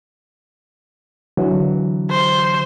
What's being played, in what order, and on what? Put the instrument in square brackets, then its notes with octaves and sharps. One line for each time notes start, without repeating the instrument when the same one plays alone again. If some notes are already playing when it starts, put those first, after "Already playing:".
[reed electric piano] D3 E3 F#3
[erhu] C5